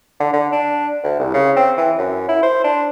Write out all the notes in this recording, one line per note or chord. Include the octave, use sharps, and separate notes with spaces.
D3
D3
D4
D2
C2
C#3
C4
E3
F#2
E4
C5
D4